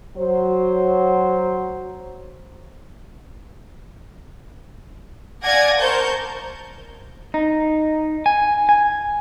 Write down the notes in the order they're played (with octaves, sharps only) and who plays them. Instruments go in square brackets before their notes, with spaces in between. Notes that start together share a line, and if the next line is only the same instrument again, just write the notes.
[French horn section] F#3 C5
[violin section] D5 F5 F#5 G#5 G#6 A#6
A#4 C5 A5 C#6 G6
[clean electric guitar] D#4
G#5
G#5